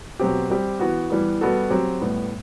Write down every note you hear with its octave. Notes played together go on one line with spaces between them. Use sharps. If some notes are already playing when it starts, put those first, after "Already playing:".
B2 F#3 C4 G4
G3 C4 G4
E3 B3 F#4
E3 G3 B3
G3 B3 F#4 A4
F#3 C4 G4
A2 G3 B3